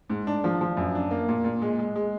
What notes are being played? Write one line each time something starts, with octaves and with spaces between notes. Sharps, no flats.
G#2
D4
F3
F3
F#2
D4
A#3
A#2
A#2
G#3
G#3
G#3